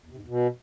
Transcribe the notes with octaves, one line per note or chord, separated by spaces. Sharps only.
E2
C3
G#2
E2
B2